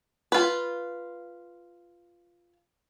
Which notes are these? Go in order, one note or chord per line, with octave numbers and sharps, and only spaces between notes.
F4 B4